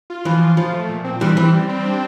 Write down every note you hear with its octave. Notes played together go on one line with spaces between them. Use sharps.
F4
E3 F3
F4
F3 F4
A3
A#2
C4
E3 G3 C4
E3 C4
G3
C4
D4